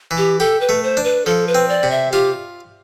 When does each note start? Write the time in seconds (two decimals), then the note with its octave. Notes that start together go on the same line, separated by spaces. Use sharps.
0.11 E3
0.17 G4
0.40 G4 A4
0.61 B4
0.69 A3
0.83 C5
0.97 D4
1.04 B4
1.26 F3 A4
1.48 B4
1.55 C4
1.69 D5
1.83 C3
1.91 E5
2.12 F4 G4